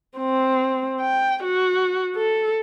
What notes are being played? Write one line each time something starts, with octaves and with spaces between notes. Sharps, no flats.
C4
G5
F#4
A4